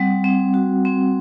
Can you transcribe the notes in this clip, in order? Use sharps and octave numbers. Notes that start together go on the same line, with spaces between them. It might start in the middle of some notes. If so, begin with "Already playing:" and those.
Already playing: G3 C4 F#5
C4
F#4
C4